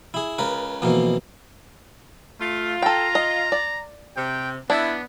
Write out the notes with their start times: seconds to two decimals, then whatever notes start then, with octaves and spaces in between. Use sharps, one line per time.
0.14 E4 G#4
0.38 C#2 C#3 A#4 B4
0.82 F2 B2 E3 A#3
2.40 A3 F4
2.82 A4 G5 A#5
3.15 D#5
3.52 D5
4.16 C3 G5
4.70 B3 D4 E4